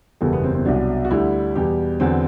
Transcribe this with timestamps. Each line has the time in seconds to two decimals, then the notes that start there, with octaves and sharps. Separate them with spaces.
0.21 F#1 E2 B2 G3 A4
0.33 B3
0.44 C4
0.54 C4
0.65 C2 B2 F#3 D4
1.05 F#4
1.10 D2 D3 G3 E4
1.55 E2 B2 G3 G4
2.00 E2 D3 F#3 C4